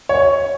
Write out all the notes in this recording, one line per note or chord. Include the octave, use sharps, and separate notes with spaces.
C#5